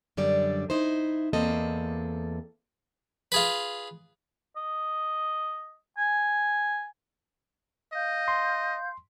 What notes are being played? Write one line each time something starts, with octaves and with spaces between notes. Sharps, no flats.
F#2 D3 G3 D5
D#4 E4 C5
E2 A#3 C4 A4 D#5
F4 G#4 B4
D#5
G#5
D#5 F5 G6
C6